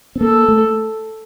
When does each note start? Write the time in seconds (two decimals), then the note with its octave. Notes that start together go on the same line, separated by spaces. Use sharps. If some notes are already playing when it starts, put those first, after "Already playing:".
0.16 C4
0.20 A#3 A4
0.48 A3